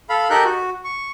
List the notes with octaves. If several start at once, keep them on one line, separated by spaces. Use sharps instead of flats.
A4 F5 B5
D#4 G4 A4 A#4 F#6 G6
F#4
C#6